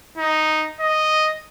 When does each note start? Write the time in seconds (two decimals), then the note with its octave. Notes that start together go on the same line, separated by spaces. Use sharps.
0.18 D#4
0.80 D#5